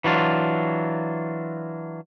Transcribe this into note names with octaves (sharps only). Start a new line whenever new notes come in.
E3 F#3 D4 F4